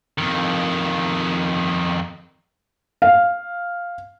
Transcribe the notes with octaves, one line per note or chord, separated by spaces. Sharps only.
F2 D#3
F5